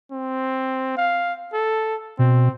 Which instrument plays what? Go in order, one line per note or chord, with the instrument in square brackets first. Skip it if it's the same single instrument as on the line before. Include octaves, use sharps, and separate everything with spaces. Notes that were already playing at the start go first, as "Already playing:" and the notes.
[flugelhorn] C4
F5
A4
[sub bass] B2 [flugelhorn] C4